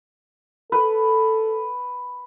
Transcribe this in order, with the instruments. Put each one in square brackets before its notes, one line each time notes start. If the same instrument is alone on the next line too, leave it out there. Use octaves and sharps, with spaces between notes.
[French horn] A4 [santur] B4